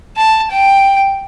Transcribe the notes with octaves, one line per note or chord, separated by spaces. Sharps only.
A5
G5